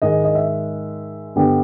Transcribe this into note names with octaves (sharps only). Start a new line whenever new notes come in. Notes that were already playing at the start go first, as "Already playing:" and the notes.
G#2 D#3 G#3 D#5
D#5
E5
G2 D3 G3 B3